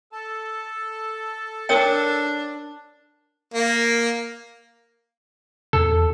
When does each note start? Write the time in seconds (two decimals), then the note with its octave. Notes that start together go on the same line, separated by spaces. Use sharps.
0.12 A4 A5
1.69 D4 A#4 C#5 G5
3.54 A#3
5.73 E2 A4